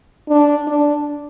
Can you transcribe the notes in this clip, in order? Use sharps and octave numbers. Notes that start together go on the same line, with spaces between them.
D4
D4